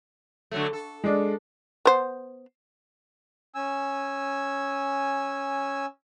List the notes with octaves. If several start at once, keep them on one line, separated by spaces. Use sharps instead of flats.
D3 F#3 A3
A4
G#3 D4
B3 C5
C#4 G#5 E6